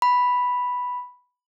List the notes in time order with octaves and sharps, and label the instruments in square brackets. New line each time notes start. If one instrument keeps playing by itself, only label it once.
[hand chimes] B5